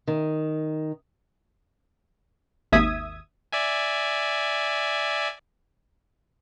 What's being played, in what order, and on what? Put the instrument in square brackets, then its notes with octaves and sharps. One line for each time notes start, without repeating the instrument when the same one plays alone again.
[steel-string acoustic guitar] D#3
[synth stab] G#1 D#2 E5 D#6 G#6
[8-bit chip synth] D5 E5 G#5